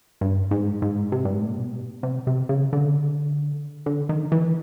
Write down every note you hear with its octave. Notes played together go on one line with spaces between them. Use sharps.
G2
G#2
G#2
C3
G2
G#2
A2
A#2
B2
C3
C3
C#3
D3
D3
D#3
E3